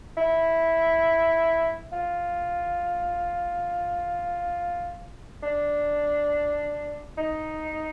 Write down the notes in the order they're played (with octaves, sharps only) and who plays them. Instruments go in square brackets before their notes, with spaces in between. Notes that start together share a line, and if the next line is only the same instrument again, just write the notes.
[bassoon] E4
F4
D4
D#4